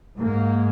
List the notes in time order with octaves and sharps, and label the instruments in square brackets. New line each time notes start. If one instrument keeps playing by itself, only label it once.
[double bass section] G#2 A#3